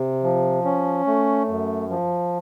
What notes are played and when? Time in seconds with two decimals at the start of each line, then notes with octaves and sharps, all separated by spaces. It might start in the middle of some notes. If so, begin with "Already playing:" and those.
Already playing: C3
0.24 F3
0.65 C#4
1.07 A3
1.48 F#2
1.90 F3